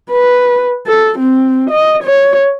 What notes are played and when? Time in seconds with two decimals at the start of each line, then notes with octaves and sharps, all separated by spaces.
0.12 B4
0.87 A4
1.19 C4
1.70 D#5
2.04 C#5